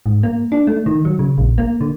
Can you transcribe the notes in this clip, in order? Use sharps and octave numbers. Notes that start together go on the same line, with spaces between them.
G#2
A#3
D4
A3
D#3
F#3
C#3
A#1
A#3
D3